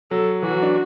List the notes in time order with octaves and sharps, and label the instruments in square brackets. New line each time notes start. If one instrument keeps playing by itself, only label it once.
[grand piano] F#3 [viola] A4
[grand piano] E3 [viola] F#4
[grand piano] F#3
D4